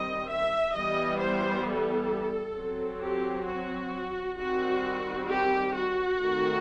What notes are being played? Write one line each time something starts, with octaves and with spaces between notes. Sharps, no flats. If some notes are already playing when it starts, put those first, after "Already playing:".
Already playing: D#3 G3 C4 D#5
E5
E3 G3 B3 D#5
C5
A4
F#3 C4
G4
F#4
D#3 G3 C4 F#4
G4
F#4
D#3 A3 C4